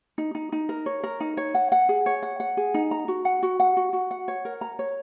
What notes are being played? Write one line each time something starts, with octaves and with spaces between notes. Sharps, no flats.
D#4
D#4
D#4
A#4
C#5
A#4
D#4
C#5
F#5
F#5
G#4
C#5
F#5
F#5
G#4
D#4
A#5
F#4
F#5
F#4
F#5
F#4
F#4
F#5
C#5
A#4
A#5
C#5